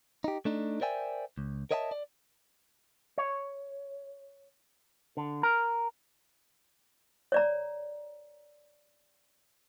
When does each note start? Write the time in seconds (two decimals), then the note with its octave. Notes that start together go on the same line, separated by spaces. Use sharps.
0.24 D#4 G4
0.45 A3 D4 D#4
0.81 A#4 C5 D5 E5 G5 G#5
1.38 C#2
1.71 A#4 C#5 D#5 E5 G5 A5
1.91 D5
3.18 C#5
5.17 D3
5.43 A#4
7.32 C#5 D5 A#5